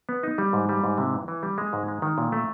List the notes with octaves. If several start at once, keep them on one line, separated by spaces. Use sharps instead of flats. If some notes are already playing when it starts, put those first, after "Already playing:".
B3
D#4
G3
G#2
G3
G#2
C3
E3
E3
G3
G#3
G#2
G#3
D#3
A#2
A3